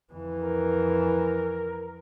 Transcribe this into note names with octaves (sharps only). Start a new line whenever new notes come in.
F2 E3
A#4